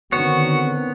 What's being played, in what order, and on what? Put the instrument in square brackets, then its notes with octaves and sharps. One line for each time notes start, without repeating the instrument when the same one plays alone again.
[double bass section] D3 D#3 C4 [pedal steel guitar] B3 C#5 [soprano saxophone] F#4